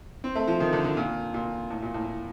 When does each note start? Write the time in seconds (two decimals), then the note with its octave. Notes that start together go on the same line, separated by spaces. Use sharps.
0.24 C4
0.35 A3
0.47 F3
0.60 D#3
0.73 D3
0.84 D3
0.97 A#2
1.34 A#2
1.70 A2
1.82 A#2
1.94 A2